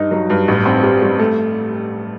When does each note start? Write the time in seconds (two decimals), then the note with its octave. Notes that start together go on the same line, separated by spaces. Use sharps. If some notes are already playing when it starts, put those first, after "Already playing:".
Already playing: G2 D#4
0.11 F#3
0.30 G2
0.48 A1
0.66 C4
0.83 G3
1.02 G3
1.19 A3